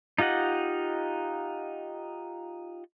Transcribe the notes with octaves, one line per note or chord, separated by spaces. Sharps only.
D#4 F4 G4 D#5 F#5